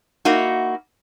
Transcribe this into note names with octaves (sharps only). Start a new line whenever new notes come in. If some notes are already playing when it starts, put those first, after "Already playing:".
A#3 D#4 E4 F#4